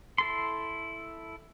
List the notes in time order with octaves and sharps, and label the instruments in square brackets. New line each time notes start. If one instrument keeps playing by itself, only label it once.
[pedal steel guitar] E4 A4 C6